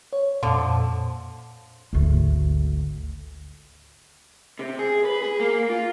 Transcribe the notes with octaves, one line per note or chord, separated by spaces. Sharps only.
C#5
F2 A#2 D3 F3
G#1 D2
C3
G#4
B4
G#4
A#3
F4